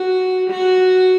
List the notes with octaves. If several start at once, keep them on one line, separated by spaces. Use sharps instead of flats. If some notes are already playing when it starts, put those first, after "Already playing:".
Already playing: F#4
F#4